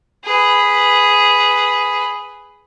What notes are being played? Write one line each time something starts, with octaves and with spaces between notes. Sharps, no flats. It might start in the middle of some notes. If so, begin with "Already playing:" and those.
G#4 B4